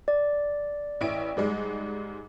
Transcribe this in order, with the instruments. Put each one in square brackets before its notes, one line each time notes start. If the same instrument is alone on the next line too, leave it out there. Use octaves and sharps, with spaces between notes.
[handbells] D5
[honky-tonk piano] A1 E4 D7
G#2 G3 G#3